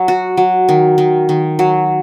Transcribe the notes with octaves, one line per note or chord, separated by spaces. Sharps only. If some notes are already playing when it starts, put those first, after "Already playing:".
Already playing: F#3
F#4
F#3
D#3
D#3
D#3
F#3